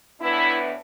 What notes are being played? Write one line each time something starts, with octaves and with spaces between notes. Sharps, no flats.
A2 E3 B3 D4 E4